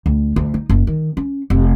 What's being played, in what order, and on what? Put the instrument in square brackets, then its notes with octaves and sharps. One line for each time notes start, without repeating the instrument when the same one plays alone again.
[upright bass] D2
D2
D#4
F#1
D#3
C#4
F1